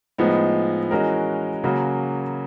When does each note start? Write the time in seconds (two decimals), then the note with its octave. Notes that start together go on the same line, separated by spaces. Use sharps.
0.18 A2 F3 G#3 B3 D#4
0.91 E3 G#3 C#4 F#4 A#4
1.64 C#3 F#3 A#3 C#4 F#4